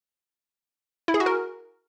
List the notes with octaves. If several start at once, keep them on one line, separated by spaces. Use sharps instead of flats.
E4
G#4
F#4
A#4